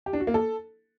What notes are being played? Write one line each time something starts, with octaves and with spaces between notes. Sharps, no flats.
G4
D4
F#4
A#3
A4